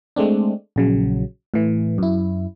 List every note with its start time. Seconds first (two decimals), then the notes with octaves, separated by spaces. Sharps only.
0.16 G#3 A3 C4 D4
0.76 A#1 C#3 F#3
1.54 A2 E3
1.98 F#2 E4